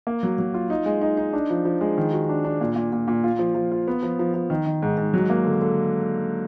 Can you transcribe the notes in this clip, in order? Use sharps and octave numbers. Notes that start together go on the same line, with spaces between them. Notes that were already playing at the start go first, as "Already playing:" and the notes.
A#3
F#3
F#3
F4
D#4
G#3
D#4
D#4
D4
F3
F3
G#3
D#3
F#4
D4
D4
A#2
A#2
A#2
A#2
F4
F3
F3
F4
B3
F3
F3
F3
D#3
D#3
G#2
G#2
F#3
A#3
D3
D3